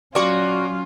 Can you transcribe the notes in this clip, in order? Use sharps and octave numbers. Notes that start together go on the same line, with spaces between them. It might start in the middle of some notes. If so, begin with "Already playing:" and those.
F#3 A#3 C#4 F4 F#4 D5 C#6